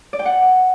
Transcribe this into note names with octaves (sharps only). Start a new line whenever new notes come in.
D5
G5
F#5